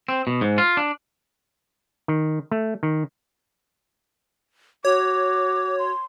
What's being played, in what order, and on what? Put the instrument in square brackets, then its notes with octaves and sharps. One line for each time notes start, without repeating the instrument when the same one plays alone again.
[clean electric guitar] C4
B2
G#2
F4
D4
[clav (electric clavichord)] D#3
A3
D#3
[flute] F#4 [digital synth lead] C#5 [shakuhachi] D6
[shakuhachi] C6